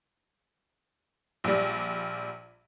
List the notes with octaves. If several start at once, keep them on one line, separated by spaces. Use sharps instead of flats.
A#1 G3